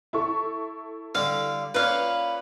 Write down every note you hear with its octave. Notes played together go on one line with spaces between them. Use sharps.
E4 A4 C#6
D3 G3 F5
A#2 C#4 B4 F5